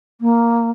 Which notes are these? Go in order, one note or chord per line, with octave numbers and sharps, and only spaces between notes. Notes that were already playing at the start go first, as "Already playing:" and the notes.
A#3